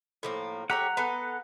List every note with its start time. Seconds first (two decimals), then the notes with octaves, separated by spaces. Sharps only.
0.23 A2 F3 A#3
0.70 G4 A4 C#5 F#5 A#5
0.97 B3 A4 G#5